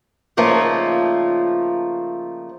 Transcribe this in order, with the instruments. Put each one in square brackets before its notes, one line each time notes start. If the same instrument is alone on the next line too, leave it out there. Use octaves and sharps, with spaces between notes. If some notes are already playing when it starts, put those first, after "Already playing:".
[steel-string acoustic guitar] C#3 F3 A3 A#3 D#4